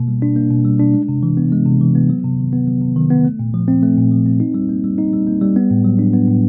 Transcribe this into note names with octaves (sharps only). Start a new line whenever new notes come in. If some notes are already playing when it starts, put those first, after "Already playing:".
Already playing: B2 A#3
G3
D4
A#3
B2
G3
D4
G#3
C3
E3
B3
G#3
C3
E3
B3
F#3
C3
D#3
B3
F#3
C3
D#3
B3
A3
A#2
F3
C4
A3
A#2
F3
C4
D#4
G3
A#3
G3
D#4
G3
A#3
G3
B3
A2
F#3
D4
B3
A2